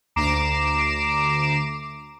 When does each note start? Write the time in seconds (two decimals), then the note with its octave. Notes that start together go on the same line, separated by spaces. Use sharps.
0.16 D2 A#5 D6 C7 D7 E7